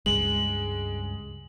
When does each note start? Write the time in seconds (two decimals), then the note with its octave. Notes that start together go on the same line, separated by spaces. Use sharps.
0.06 C#2 G2 C#3 G#3 F#7